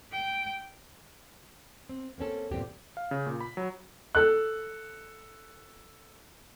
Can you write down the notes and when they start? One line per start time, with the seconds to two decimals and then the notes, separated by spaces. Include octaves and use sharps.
0.12 G5
1.89 C4
2.18 A#3 C4 C#4 A4
2.51 E2 G2 A#2 C4 G4
2.97 F5
3.11 C#3
3.26 A#2
3.41 B5
3.57 F#3
4.15 A4 F#6